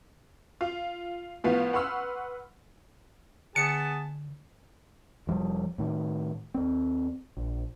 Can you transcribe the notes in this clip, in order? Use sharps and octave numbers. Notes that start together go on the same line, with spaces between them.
F4
A2 F3 B3 F5
B4 F#5 C6 C#6 E6 F6
D3 B3 G#4 A5 C#7
F1 F3 G3
A2 D#3
D#2 C4
A#1